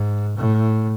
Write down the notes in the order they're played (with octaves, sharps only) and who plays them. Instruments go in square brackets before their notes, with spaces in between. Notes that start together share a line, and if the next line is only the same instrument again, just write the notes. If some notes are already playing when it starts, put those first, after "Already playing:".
Already playing: [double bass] G#2
A2